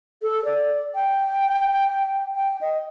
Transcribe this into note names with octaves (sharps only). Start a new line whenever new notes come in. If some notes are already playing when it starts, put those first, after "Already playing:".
A4
D5
G5
G5
D#5